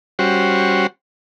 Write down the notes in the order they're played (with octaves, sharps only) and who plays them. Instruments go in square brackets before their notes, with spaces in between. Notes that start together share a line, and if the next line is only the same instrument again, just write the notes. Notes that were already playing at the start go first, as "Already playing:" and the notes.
[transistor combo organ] G3 C#4 F#4 C5